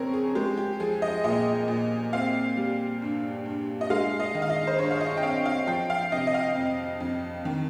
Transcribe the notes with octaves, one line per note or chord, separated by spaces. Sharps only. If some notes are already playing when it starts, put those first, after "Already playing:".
Already playing: F2 C#3 C4 A#4 C#5
G#4
G#3 G4
G4
F3 G#4
D#5
A#2 D#5
A#2
C4 F5
G3
G2
G2
D#5
G#3 F5
D#5
D#3
F5
D#5
C5
G2 C#5
F5
D#5
G5
C4 F5
F5
F3 G5
F5
C3 D#5
D#5
F5
F2
F2
D#3